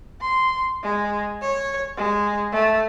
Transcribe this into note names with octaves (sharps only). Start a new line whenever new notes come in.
C6
G#3
C#5
G#3
A3